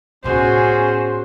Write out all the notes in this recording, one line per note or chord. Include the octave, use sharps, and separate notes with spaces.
A2 B3 C#4 F#4 G#4 C5